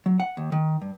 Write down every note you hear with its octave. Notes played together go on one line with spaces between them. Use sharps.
F#3
F#5
D#2
D#3
G2